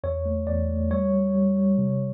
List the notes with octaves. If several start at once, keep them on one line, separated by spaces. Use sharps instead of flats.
E2 C#5
A3
E2 D5
A3
G3 C#5
G3
G3
G3
C3